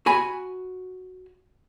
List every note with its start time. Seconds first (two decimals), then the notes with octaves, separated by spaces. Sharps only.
0.06 F#4 G#5 B5